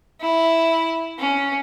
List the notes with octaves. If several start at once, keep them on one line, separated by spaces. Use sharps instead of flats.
E4
C#4